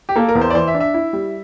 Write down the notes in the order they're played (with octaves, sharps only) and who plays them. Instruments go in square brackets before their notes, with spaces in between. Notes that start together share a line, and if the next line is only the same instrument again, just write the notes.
[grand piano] G4
[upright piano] A#3 [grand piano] A4
[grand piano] A#4
[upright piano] E2
[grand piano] C5
D5
[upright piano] E3 [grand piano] C5
[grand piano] E5
[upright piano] D4
[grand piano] E5
[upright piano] E4
G3